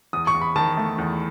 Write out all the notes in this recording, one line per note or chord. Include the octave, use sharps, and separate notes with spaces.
E2 D#6
C#6
E2
B5
D#3 A5
A3
E2